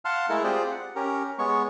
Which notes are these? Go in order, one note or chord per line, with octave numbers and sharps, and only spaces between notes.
F5 F#5 A5 C6 F6
G#3 A3 E4 A4 A#4
C4 F4 G4 G#4 C5 D5
F#5
C#4 G4 A#4
G#3 B3 C#5 C#6